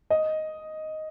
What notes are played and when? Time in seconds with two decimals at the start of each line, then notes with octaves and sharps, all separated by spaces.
0.10 D#5